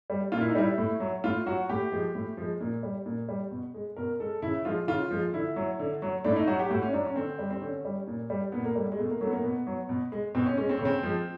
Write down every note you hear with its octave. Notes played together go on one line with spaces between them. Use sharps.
G3
A#2 F4
E4
D#4
G3 E4
A2
F#3
A2 F4
F#3 F#4
A2 G4
F3 G#3
A2
F3 G#3
A#2
G3
A#2
G3
B2
G#3
B2 A#4
G#3 A4
C#3 E4
F3 G#3 F4
C#3 F4
F3 G#3
D3 E4
F#3
D3
F#3
A2 D4
E4
D#4
F#3 F#4
G4
A2 F#4
C#4
F#3 D4
C#4
D3 C4
G3
C4
D3 C#4
G3
A#2
G3
A#2 B3
A#3
G3 A3
G#3
B2 A3
A#3
F#3 A3
B3
A#3
B2 B3
F#3
B2
G#3
B2 C4
C#4
G#3 C#4
C4
C#4
C#3 C4
F3 G#3